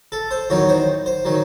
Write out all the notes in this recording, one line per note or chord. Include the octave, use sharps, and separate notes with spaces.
A4
C5
E2 D#3 F#3 C#5
C5
C5
D#3 F#3